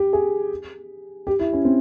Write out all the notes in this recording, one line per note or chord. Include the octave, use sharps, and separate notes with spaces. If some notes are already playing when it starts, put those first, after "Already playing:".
Already playing: G4
G#4
G4
E4
C#4
C4